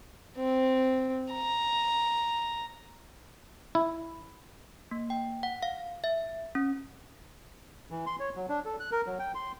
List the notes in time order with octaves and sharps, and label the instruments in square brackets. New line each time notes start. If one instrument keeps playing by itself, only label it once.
[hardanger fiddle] C4
A#5
[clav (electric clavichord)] E4
[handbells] A#3
G5
F#5
F5
E5
C#4
[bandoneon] E3
C6
C#5
F#3
D4
A4
F#6
A#4
F#3
G5
C6